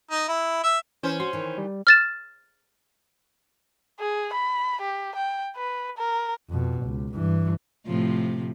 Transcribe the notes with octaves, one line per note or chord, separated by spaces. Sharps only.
D#4
E4
E5
E3 C#4 C5
F#4 C6
D#3 E3
G3
F6 A6 E7
G#4
B5
G4
G5
B4
A#4
F2 B2
C#2
G2 E3
A2 C3 F3